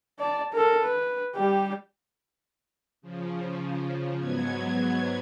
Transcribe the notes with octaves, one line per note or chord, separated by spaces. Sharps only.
D5 A5
A4 A#4
B4
G3 G4
C#3 F3
G#2 F#3 B3 G#6